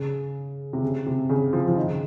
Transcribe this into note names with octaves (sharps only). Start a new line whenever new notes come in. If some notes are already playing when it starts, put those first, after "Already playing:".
Already playing: C#3
C3
C#3
C3
C#3
F3
F3
D#3
C#3